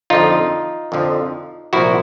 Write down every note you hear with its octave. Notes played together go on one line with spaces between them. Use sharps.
F2 D3 F3 D#4 F4
F2 D3 F3
C2 A#2 F3 E4 F#4